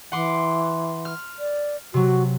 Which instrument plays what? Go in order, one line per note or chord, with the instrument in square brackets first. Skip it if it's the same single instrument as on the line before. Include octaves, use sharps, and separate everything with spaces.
[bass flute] E3 [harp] F#5 C6 D6
[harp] F6
[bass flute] D5
[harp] C3 F#3 [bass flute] F#4